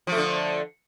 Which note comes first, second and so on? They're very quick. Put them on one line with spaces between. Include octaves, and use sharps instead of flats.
F3 A3 D3